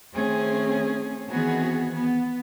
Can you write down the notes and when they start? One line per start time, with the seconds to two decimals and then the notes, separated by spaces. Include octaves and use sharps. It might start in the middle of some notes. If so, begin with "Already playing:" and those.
0.15 D#3 A3 C4 C#4 G#4
1.30 D#3 E3 B3 C4 F#4 G#4
1.94 B3